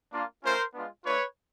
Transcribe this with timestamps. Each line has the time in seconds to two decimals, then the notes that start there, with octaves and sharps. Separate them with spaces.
0.12 A#3 D4 F4
0.43 A3 C#4 F4 A#4 C5
0.74 G#3 B3 D4 F4
1.05 A3 D4 F4 B4 C#5